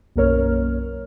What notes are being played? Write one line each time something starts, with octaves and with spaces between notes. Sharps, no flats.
B1 F#2 A#3 A#4 C#5 F6